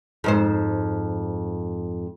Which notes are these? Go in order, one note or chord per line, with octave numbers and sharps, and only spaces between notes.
F2 G#2 C5